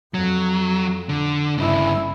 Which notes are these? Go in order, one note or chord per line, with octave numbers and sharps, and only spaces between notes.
F2 F#3
D3
G1 G2 C#3 E4